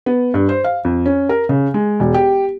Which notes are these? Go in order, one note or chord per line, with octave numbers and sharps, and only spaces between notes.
B3
G2
C5
F5
F2
C#4
A#4
C#3
G#3
E1
G4